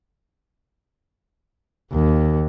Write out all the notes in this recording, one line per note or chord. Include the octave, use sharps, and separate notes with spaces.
D#2